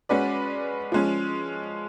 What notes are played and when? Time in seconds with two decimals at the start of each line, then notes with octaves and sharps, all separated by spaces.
0.09 G#3 C#4 F#4 B4 D5
0.92 F3 G#3 C#4